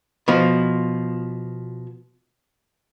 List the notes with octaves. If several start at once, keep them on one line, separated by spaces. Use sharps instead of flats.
B2 F3